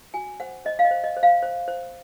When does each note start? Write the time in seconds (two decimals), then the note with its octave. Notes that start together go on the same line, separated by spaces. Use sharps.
0.14 F#4 G#5
0.40 C5 F#5
0.65 C5 D#5
0.79 F5
0.85 D#5
0.91 C5
1.04 D#5
1.17 C5
1.23 F5
1.43 C5
1.68 C5